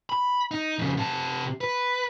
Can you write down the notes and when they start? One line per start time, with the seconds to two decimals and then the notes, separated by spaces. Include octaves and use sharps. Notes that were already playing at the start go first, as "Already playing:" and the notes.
0.10 B5
0.51 D#4
0.79 F2 C#3
0.98 C3 A5
1.61 B4